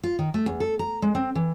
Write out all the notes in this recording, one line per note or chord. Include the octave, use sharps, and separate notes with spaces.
F4
D#3
A3
E2
A4
A#5
G#3
C4
E3